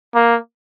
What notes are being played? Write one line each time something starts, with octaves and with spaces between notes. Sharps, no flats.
A#3